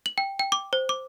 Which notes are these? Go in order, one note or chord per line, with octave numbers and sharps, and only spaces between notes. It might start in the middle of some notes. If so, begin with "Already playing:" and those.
F#7
G5
G5
D6
C5
D6